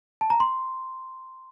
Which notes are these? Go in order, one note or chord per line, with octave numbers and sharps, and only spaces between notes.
A5
A#5
C6